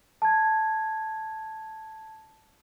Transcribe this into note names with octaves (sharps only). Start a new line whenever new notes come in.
A5 G#6